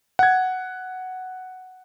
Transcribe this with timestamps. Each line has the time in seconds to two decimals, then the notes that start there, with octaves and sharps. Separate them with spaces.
0.19 F#5 G#6